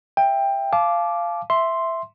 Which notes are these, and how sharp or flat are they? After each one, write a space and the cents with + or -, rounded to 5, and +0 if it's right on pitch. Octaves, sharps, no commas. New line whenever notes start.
E5 +0 G5 +15
F5 -15 A5 -35 D6 +0
E5 +0 C6 +0